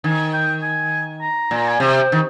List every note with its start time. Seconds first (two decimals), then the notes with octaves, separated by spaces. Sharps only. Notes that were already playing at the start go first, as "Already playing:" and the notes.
0.04 D#3 G#5
0.33 G5
0.62 G#5
1.21 A#5
1.51 A#2
1.57 A#5
1.68 G#5
1.80 C3 G5
2.12 D#3